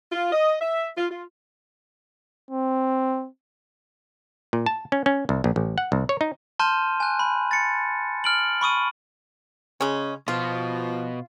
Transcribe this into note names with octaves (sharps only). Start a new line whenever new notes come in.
F4
D#5
E5
F4
F4
C4
A#2
A5
C#4
C#4
C2
A#1
A1
F#5
C2
C#5
D#4
A5 C6 F6 G6 D#7
G#5 F#6
B5
A6 C#7
F6 D7 F#7
B5 C#6 D#6 D#7
C#3 G#3 C#4
B2 F3 B3 F4